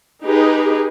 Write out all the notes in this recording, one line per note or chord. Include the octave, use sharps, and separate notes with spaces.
D#4 G4 G#4 B4